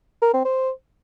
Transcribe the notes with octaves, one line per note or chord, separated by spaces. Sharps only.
A#4
C4
C5